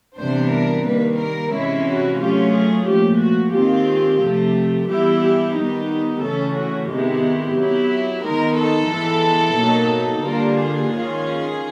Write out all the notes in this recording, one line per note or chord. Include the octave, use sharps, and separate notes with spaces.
C3 E3 G3 B3 D4 C5
A#4
D#3 G3 A#3 B4
A#4
C3 E3 G#3 C#4 E4
F#4
F#3 A3 C#4 F4 G4
G#4
A#2 F3 A3 G4
F#4
D#3 G#3 C4 F4 G4
C3 F3 A3
E3 G3 B3 E4 G4
G4
D#3 G3 B3 D#4
C#3 E3 A3 C#4 A4
F#4
C3 D#3 G#3 B3 E4 G4
F#3 B3 E4
D#3 G#3 B3 D#4 A#4
A4
E3 G#3 B3 E4
B2 F#3 A#3 D#4
D3 G3 A#3 D4 F4 A#4
G#4
D#3 G#3 C#4 F4